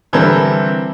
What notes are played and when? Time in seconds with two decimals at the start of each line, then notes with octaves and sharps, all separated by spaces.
0.13 D3 E3 G3 C4 A4 A#4